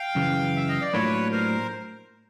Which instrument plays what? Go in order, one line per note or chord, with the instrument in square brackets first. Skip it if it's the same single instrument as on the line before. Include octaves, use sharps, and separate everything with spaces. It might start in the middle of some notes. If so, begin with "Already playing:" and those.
Already playing: [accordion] F5 G5
[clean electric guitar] F#2 C#3 E3
[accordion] E5
D#5
D5
[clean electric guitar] A2 F#3 A#3 D4 F4 [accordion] B4 C#5
[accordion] A#4 C5